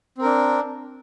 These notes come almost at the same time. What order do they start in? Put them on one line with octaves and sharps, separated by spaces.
C4 A#4 D4